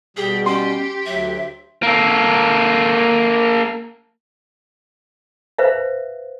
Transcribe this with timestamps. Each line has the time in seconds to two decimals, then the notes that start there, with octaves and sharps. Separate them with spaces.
0.17 B2 G3 G4 G#4
0.46 C#4 G4 C6
1.06 D2 F#3 E5
1.83 A#3 A4
5.58 B4 C5 E5 F5